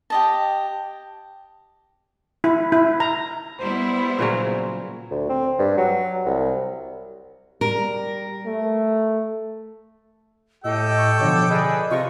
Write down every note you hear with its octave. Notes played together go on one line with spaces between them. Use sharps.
G4 D#5 A5
E4
E4
A#5
G3 B3 E4 C5
A#2 C#3 F#3
D2
C4
G2
F#3
C2
G3 A#4
A3
A2 G4 A4 D#5 G5 E6
C#6
B2 D3 F3 C#5 D6
G#4 B4 D5 D#5
C3 F4 D#5 C#6